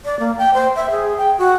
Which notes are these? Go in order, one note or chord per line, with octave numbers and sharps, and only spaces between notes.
D5
A#3
G5
C5
E5
G#4
G5
F#4